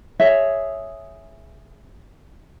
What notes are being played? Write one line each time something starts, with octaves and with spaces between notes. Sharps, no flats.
G#4 C#5 E5